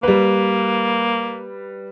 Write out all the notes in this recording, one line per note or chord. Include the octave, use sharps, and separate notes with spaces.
G3 A#3 B4